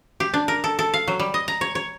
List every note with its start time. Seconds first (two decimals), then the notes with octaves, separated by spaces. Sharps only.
0.20 G4
0.34 D4
0.48 A#4
0.64 A4
0.79 A4
0.94 F5
1.08 F#3
1.20 G3
1.34 D#5
1.48 A#5
1.61 C#5
1.75 C#5